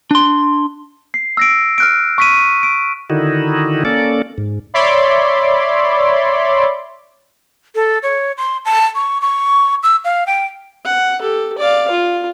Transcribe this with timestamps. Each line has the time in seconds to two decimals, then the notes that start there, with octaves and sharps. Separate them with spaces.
0.11 D4 C6
1.14 C7
1.37 E6 A#6 D7
1.78 F6 F#6 D7
2.18 C#6 B6 D#7
2.63 D7
3.10 D3 D#3 D#4 E4 F#4
3.85 A#3 C#4 A4 D5
4.38 G#2
4.74 C#5 D5 E5 B5 C6 D6
7.75 A4
8.03 C#5
8.38 C6
8.65 A5
8.95 C#6
9.21 C#6
9.83 E6
10.05 F5
10.27 G5
10.85 F#5
11.20 G4 A4
11.58 D5 F5
11.91 F4